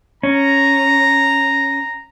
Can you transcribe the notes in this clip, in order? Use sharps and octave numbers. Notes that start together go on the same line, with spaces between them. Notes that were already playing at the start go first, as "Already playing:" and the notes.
C#4 A#5